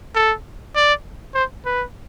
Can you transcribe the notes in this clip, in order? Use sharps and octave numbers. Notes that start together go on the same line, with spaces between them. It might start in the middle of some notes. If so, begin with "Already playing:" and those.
A4
D5
C5
B4